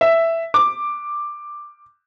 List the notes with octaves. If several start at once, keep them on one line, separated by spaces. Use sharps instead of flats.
E5
D6